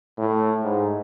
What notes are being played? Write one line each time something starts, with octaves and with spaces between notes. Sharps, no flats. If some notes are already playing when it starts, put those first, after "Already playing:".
A2
G#2